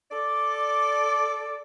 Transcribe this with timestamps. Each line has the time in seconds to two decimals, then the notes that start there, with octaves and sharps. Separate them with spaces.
0.11 A4 D5